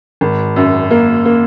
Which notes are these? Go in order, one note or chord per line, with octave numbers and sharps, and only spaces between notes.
G#1
F#2
A#3
A#3